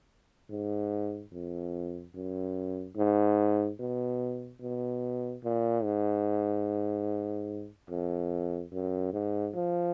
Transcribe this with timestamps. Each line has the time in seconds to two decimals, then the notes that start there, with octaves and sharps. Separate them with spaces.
0.50 G#2
1.33 F2
2.15 F#2
2.97 G#2
3.79 B2
4.62 B2
5.44 A#2
5.84 G#2
7.90 F2
8.72 F#2
9.13 G#2
9.55 F3